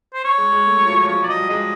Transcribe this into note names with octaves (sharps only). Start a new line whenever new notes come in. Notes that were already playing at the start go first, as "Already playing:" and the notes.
C5
C#5
G#3
G#3
A3
F#3
F3
F#3
F3 C#5
F#3 D5
D#5
G3
G#3 D#5